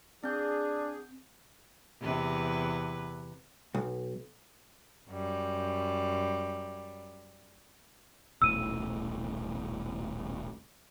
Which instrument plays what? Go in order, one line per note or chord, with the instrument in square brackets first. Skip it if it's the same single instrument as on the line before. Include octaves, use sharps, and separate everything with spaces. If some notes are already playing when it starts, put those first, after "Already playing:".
[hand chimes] C4 G6 [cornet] D4 [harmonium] G#4
[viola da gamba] E2 C3 B4
[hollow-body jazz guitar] B1
[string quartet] F#2 G3
[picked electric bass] D#1 B1 A2 [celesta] E6 D#7